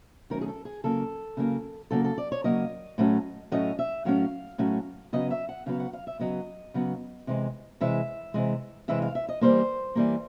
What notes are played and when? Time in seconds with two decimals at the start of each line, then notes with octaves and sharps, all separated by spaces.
0.30 D#3 F#3 A3 C#4 A#4
0.41 G#4
0.48 A4
0.65 G#4
0.84 C#3 F#3 A#3 A4
1.37 C#3 F#3 A#3
1.91 C#3 F#3 A#3 A4
2.04 A4
2.18 D5
2.32 C#5
2.44 C#3 F#3 A#3 D#5
2.98 A2 F#3 A3 C#4
3.52 A2 F#3 A3 C#4 D#5
3.79 E5
4.05 A2 F#3 A3 C#4 F5
4.58 A2 F#3 A3 C#4
5.13 C#3 F#3 B3 D#5
5.31 E5
5.49 F#5
5.66 C#3 F#3 B3 F5
5.80 F#5
5.93 F5
6.07 E5
6.19 C#3 F#3 B3 D#5
6.74 C#3 F#3 B3
7.27 C3 E3 G#3
7.81 C3 E3 G#3 E5
8.34 C3 E3 G#3
8.88 C3 E3 G#3 E5
9.02 F5
9.15 E5
9.29 D#5
9.41 E3 G3 A#3 C5
9.95 E3 G3 A#3